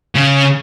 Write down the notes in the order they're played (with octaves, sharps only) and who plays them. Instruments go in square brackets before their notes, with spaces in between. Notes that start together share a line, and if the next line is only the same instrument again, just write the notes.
[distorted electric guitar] C#3